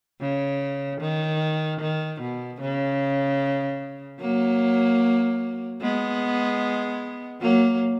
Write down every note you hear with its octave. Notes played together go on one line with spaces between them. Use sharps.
C#3
D#3
D#3
B2
C#3
F#3 A#3
G#3 B3
F#3 A#3